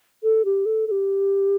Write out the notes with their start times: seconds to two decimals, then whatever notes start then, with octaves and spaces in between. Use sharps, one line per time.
0.23 A4
0.45 G4
0.66 A4
0.87 A4
0.91 G4